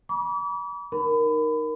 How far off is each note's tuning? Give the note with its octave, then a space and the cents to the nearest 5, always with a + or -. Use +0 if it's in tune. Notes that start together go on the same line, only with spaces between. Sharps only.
B5 -40 D6 -40
D#4 +0 A#4 +0 B5 +25